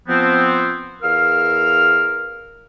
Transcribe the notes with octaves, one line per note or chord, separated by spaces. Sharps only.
F3 B3 C4
E2 A#4 F5 E6 F6